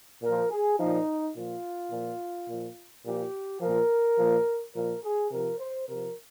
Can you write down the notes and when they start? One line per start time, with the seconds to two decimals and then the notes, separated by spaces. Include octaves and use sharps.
0.22 A#2 F3 A#4
0.50 G#4
0.79 A#2 F3 D#4
1.36 A#2 F3 F4
1.91 A#2 F3
2.48 A#2 F3
3.05 A#2 F3 G4
3.61 A#2 F3 A#4
4.18 A#2 F3
4.75 A#2 F3 A#4
5.03 G#4
5.31 C3 F3 A#4
5.59 C5
5.88 C3 F3 A#4